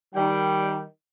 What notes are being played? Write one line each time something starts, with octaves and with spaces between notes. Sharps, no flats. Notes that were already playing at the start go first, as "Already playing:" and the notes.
D#3 G3 G5